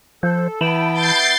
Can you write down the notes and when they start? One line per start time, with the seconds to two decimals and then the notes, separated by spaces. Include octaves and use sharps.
0.23 F3 A4 C5
0.61 E3 B3 E4 G5 A5 B5
0.92 G6 A6 C7